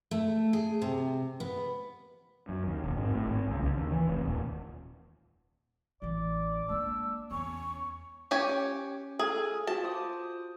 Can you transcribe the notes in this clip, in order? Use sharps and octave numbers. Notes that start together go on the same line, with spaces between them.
A3
G#4
C3
B3
F#2
D#2
E1
G#1
A2
G#1
C#2
C#2
D#2
E3
F1
D#1
A1 E3 D5
G#3 A#3 D4 E6
E2 C#4 C#6
C#4 G4 C#5 G#5
G#4 A4 F6
F4 F#4 A5
C5 D6 D#6